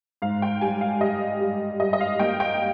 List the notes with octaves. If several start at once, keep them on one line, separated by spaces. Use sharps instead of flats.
G#2 F5
G5
G3 G#5
F5
G3 D#5
G3
G3 D#5
D#5
F5
A#3 G5
G5